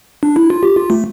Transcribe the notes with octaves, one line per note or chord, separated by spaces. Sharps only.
D4
E4
F4
G4
F4
A3